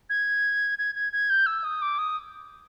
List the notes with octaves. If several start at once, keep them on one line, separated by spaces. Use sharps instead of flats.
G#6
G#6
G#6
G#6
G6
E6
D#6
D6
D#6